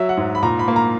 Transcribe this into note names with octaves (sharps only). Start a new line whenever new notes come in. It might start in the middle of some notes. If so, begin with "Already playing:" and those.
Already playing: F#3 E5
F#5
G#2
B5
A#2 A#5
B5
A#3
A#5